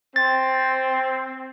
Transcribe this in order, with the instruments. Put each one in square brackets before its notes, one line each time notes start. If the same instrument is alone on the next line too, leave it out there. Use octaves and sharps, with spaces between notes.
[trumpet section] C4 [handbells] A6